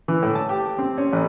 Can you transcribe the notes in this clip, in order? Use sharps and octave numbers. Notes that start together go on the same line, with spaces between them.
E3
A2
A5
G4
C4
C#4
A1